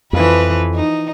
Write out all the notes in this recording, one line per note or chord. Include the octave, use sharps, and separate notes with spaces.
F2 E3 F3 B4
D#4